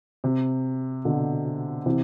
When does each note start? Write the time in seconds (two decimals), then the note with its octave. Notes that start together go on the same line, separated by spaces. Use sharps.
0.24 C3
1.05 B2 D3
1.86 C3 E3